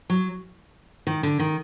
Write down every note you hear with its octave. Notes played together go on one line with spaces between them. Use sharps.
F#3
D#3
D3
D#3